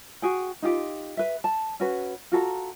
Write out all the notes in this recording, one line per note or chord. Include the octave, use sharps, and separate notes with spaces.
F#4 G#4 G5
D#4 F4 G4
B4 E5
A5
C#4 F#4 B4
F4 F#4 A4 A#5